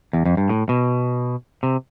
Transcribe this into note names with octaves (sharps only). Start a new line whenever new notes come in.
E2
F2
G2
A2
B2
C3